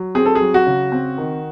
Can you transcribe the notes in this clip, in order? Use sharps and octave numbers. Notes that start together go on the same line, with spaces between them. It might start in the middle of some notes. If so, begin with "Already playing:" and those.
Already playing: F#3
C4 G#4
A4
G#4
F#3
F#4
C#3
C4
D#3